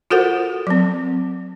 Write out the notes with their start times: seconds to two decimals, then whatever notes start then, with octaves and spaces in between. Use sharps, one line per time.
0.10 F4 F#4 A4 A#4 C5 F#5
0.67 F#3 C4